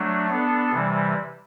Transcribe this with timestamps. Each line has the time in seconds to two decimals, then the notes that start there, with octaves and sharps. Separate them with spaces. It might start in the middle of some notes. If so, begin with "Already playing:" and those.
Already playing: F#3 A3 D4
0.29 B3 D4 A4
0.71 C3 E3 G3